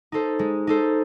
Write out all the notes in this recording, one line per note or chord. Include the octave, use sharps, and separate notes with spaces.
D#4 A4 C5
G#3
D#4 A4 C5